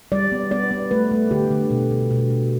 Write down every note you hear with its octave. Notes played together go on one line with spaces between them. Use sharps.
G3 D5
B3
B3 D5
B3
A3 B4
A3
D3 G4
D3
B2
B2
B2
B2